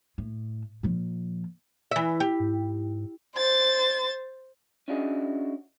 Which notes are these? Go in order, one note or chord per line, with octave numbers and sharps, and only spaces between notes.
A2
A#2 F3
E3 E5
G4
G#2
C5 A6
C#4 D4 E4 F#4 G#4 D#5